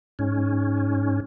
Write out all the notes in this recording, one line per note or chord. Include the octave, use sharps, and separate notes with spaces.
G#2 C#4